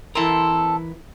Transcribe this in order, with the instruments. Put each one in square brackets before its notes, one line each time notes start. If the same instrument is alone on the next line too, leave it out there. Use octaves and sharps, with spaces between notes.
[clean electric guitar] E3 E4 A#4 [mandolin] C4 A4